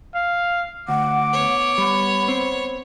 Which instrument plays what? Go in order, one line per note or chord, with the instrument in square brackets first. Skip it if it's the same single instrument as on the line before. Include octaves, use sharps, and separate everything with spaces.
[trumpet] F5
[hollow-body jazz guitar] D2 [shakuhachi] F#5 [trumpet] D6
[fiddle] B3 C#5
[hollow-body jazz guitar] G3 [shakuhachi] B5
[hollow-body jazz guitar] C4